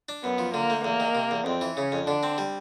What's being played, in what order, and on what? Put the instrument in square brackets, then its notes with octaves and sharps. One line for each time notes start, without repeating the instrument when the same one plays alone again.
[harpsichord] D4
[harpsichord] F#2 [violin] B3
[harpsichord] F3
[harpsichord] D3 [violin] A#3
[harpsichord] A3
[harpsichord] E2 [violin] A#3
[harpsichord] D#3
C3
E2
[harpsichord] F2 [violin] C4
[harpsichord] E3
[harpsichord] C#3 [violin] C#4
[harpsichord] F2
[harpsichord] D3 [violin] D4
[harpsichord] C4
G3